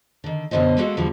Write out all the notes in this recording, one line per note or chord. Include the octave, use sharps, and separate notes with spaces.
D3 D#3
F#2 B2 D3 A3 C5 D#5
G#3 A#3 B3 F#4 A4
E2 D3 F3 G3 F#4